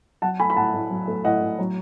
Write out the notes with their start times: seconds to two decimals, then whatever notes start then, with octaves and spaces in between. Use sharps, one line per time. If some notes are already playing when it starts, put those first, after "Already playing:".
0.22 F#3 F#5 A5
0.40 A3 G#5 B5
0.50 B5
0.56 A2 F#5 A5
0.74 A2
0.90 F#3
1.08 A3
1.24 A2 D#5 F#5
1.41 A2
1.59 F#3